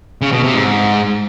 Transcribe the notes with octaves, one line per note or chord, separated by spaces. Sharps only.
C#3
B2
C3
G#2